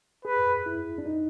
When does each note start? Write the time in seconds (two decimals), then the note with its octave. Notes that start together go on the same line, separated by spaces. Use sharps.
0.25 G#4 B4
0.66 E4
0.98 D4
1.06 D#4